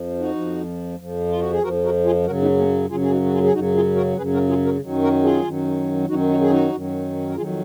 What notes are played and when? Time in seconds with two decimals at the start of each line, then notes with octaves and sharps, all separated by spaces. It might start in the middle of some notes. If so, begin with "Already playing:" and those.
Already playing: F2 F3
0.19 D#4 F#4
0.35 F2 F3
0.99 F2 F3
1.29 F4
1.40 F#4
1.51 G#4
1.63 F2 F3 F#4 A#4
1.84 F#4 A#4
2.05 F4 G#4
2.26 F#2 C#3 F#3 F#4 A#4
2.42 B3 D#4
2.58 A#3 C#4
2.90 F#2 C#3 F#3 F4 G#4
3.01 G#4
3.11 D#4 F#4
3.26 F#4
3.32 F4 G#4
3.43 G#4
3.53 F#2 C#3 F#3 D#4 F#4
3.75 F4 G#4
3.96 F#4 A#4
4.17 F#2 C#3 F#3 G#4 B4
4.34 F#4 A#4
4.49 F4 G#4
4.65 F#4 A#4
4.81 F#2 D#3 F#3
5.02 F#4 A#4
5.23 F4 G#4
5.44 F#2 D#3 F#3
6.08 F#2 D#3 F#3 D#4 F#4
6.29 D#4 F#4
6.41 G#4
6.50 D#4 F#4
6.72 F#2 D#3 F#3
7.29 A#4
7.35 F2 D#3 F#3 F4 G#4